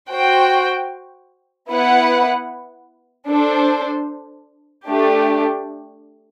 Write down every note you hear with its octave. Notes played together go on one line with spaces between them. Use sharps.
F#4 C5 G5
B3 E4 B4 F#5
D4 A4 C5
A3 D4 G4